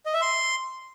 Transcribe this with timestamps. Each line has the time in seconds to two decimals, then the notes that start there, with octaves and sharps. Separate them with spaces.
0.06 D#5
0.14 E5
0.22 C6